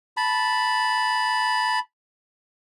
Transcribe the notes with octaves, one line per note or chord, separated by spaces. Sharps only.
A5 B5